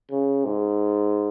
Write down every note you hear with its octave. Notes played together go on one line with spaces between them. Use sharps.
C#3
G#2